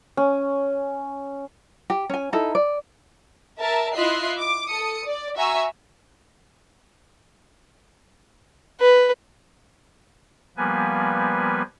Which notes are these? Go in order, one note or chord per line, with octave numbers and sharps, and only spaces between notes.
C#4
G4
C#4 G#5
D#4 E4 A4
D5
A#4 E5 A5
E4 F4 D#5 E5 F#6 C7
D6
A4 D#6 C#7
D5
F#4 E5 G#5 A#5 C#6 E6
B4
F3 G3 A#3 B3 B4 G#5